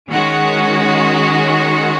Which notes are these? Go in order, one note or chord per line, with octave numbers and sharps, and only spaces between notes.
D#3 G#3 C#4 F#4